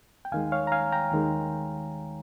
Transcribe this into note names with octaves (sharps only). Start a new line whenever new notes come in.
G5
D#2 D#3 G#3 F5 G#5
C#5 F5
A#5
F5 G#5
G5 A#5
D#2 D#3 G#3